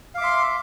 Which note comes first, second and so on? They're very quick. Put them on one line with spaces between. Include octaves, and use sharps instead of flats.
F5 D6 E5 C6